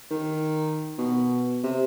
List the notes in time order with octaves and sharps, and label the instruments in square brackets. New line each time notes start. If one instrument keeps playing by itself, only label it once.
[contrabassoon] D#3
B2
C3